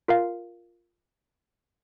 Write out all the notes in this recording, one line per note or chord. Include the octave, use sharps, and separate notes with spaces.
F4 A#4 F5